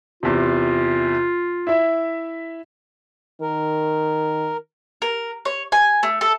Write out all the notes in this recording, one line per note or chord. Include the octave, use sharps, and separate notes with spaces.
E2 C3 F4
E4 E5
D#3 A#4
A#4
C#5
G#5
A3
A4